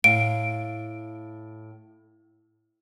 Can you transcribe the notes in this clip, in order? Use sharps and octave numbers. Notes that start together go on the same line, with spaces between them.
A2 F5 D7